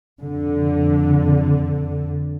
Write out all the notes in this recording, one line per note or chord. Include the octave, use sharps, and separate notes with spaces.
F2 D3